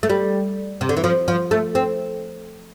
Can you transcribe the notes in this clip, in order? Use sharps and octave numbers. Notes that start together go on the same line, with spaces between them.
A3
G3
C3
D3
E3
F3
F3
A3
C4